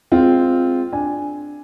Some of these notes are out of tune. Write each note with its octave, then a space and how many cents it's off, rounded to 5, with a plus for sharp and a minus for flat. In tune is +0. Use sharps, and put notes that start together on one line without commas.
G#3 +0 C4 -5 F4 +0
D4 +0 G#5 +0